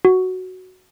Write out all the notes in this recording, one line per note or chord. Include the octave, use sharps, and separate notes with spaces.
F#4